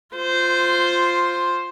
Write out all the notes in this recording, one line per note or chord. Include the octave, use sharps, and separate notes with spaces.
F4 C5